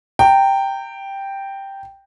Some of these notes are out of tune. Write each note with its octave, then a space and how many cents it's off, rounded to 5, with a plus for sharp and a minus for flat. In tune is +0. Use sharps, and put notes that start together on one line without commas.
G5 +0 A#5 -30